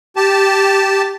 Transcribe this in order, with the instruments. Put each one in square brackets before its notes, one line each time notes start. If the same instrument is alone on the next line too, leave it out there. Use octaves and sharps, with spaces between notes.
[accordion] G4 A5